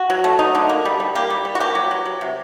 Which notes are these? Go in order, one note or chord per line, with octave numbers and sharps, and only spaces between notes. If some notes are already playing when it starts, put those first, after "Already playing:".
Already playing: F#4
F#3
A3
D#4
D3
A#3
G3
G3
A#3 G4
G3
G3
F#4
A#3 G4
F#3
F#3
F#3
C3